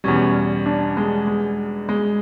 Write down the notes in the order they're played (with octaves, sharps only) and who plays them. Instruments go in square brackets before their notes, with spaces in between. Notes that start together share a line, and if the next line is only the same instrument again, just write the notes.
[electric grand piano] E2 B2 G3 [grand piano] C#4
[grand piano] D4
G#3
G#3
G#3